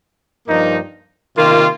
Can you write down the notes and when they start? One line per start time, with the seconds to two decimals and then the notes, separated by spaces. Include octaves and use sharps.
0.48 G2 F3 A#3 D#4
1.37 C3 D#3 A#3 F4